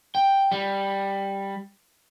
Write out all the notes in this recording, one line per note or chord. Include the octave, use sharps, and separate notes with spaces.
G5
G3